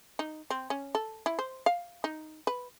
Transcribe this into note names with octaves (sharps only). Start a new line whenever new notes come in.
D#4
C4
C#4
A4
E4
C5
F5
D#4
B4